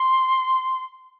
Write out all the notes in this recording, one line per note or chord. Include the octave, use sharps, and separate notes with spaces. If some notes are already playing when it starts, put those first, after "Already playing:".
Already playing: C6